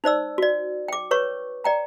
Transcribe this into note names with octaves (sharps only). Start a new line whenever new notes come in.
D#4 C5 D5 E6
F#4 D5
G5 D6
B4 C#5 C#6
D5 G5 A#5